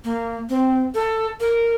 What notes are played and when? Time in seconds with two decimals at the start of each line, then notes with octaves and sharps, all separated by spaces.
0.05 A#3
0.50 C4
0.95 A4
1.41 A#4